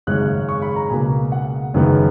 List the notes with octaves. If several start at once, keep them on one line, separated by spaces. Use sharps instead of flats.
G#1 F#2 C#3 G#3 C#4 F#6
C#6
B5
A#5
C#2 B2 A#3 G#5
F#5
F#1 F#2 D#3 G#3 B3